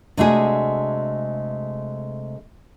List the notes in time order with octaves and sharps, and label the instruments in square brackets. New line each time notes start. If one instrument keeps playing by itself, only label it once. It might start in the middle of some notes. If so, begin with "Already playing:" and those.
[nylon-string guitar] C3 G#3 A3 D4 F#4 G#4